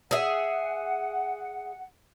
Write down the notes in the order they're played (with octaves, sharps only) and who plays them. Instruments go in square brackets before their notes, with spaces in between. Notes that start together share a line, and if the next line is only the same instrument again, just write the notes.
[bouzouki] G#4 E5 [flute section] F#5